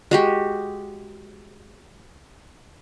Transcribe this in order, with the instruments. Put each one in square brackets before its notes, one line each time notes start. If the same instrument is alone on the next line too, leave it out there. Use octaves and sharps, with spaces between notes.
[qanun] G#3 F#4 G4